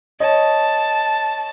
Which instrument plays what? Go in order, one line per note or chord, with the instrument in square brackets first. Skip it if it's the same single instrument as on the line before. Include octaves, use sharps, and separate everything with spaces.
[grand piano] C#5 D#5 [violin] A5